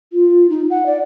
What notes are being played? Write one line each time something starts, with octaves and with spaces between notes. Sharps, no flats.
F4
D#4
F#5
D5